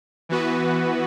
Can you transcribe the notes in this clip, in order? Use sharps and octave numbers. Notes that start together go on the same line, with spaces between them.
E3 B3 F#4 B4